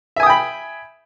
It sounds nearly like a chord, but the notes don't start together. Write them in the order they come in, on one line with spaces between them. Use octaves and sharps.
E5 G#5 D#6 G5 B5